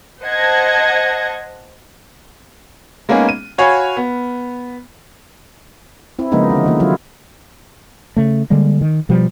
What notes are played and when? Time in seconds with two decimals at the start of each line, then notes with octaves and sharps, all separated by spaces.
0.23 C5 D#5 F#5 A5 G#6 A#6
3.09 G#3 A#3 B3 C#4 D#4 G#4
3.29 D#7
3.58 F#4 C#5 F5 G#5 B5
3.97 B3
6.19 C4 E4
6.32 C#3 F3 G#3 A#3 B3 D#4
6.50 D3 E3
6.64 D3 D#3 A#3
6.80 F#3 E4 F4
8.17 C#3 A3
8.50 D3 G3 G#3 A#3
8.81 D#3
9.09 B2 F3 G3